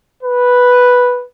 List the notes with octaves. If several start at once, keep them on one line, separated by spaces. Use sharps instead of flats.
B4